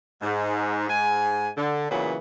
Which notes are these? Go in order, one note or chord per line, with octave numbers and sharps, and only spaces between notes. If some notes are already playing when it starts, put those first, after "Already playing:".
G#2
G#2 G#5
D3
A#2 C#3 E3 F#3 B3